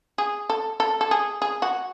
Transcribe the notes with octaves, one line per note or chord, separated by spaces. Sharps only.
G#4
A4
A4
A4
G#4
G#4
F#4